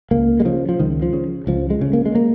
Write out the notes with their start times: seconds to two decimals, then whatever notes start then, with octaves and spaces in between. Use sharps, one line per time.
0.11 C#2 A#3
0.40 G#3
0.45 C#3 F3
0.69 F3
0.79 C#2 D#3
1.02 F3
1.13 C#3
1.47 C#2 F3
1.70 G#3
1.81 C#3
1.93 A#3
2.06 G#3
2.15 A#3